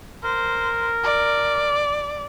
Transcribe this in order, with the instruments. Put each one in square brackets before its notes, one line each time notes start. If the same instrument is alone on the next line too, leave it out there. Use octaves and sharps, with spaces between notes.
[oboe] A#4 [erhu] C5
[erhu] D5